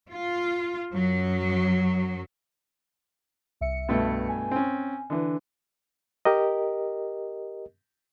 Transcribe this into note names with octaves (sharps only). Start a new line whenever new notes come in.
F4
F#2 F#3
C2 E5 C#7
G2 B2 A3
G#5
C4 C#4
D3 E3 D4
G4 A#4 D#5